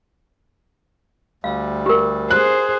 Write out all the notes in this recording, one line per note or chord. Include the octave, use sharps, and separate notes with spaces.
D2 G3 F5
G4 A#4
G#4 C5 F#6